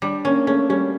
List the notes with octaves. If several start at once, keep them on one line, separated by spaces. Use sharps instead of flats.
G3 D4
A#3 C#4
A3 C#4
G3 C#4